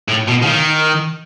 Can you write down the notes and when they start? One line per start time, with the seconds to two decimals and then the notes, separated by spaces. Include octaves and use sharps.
0.09 A2
0.29 B2
0.43 C#3
0.46 D#3